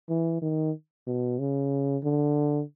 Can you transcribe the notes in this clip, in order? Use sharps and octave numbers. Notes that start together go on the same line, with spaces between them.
E3
D#3
B2
C#3
D3